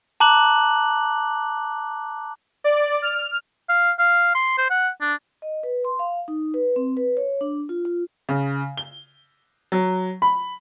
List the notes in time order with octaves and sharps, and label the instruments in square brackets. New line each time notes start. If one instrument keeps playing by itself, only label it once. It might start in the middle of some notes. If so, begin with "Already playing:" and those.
[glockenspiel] A5 A#5 D6 F#6 F#7
[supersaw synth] D5
F6
[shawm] F5
F5
C6
C5
F#5
D4
[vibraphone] D#5
B4
C6
F5
D#4
B4
C4
B4
C#5
D4
F4
F4
[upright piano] C#3
G7
F#3
B5